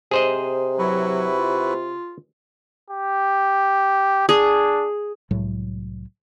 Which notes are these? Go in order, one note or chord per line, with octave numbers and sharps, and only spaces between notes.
C3 G#4 C5 D#5
F#3 E4 F#4 B4
F4
G4
D4 G#4
C2 A2 F#3 G#3